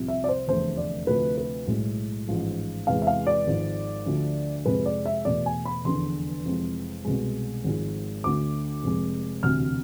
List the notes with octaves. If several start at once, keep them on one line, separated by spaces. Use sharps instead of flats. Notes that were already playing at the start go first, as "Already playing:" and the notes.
Already playing: C2 C3 F3
E5
D5
C5
F1 E2 D3 A3 C5
D5
D2 C3 F3 A3 B4
B4
B1 A2 G#3
A1 G#2 F3 G#3
E2 C3 E3 G#3 F5
E5
F5
D5
G#1 G#2 F3
D2 D3 F3 A3
F2 C3 G#3 B4
D5
E5
E2 B2 A3 D5
G#5
B5
F1 E2 D3 C6
F1 F2 E3 G#3
C2 B2 G#3
G#1 G#2 F3 G#3
D2 D3 A3 D6
F1 F2 C3 G#3
E1 D2 C3 F6